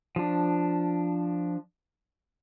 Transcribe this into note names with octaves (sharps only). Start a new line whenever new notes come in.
F3 D4